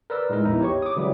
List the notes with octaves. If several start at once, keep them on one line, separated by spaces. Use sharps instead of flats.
A#4 B4 D5 E6
A2 G#3 D#4 A#4
A#1 E2 E3 D#4 E4
G4 C#5 C#6
D6 D#6
C#3 E3 F#3 G3 E4 F#4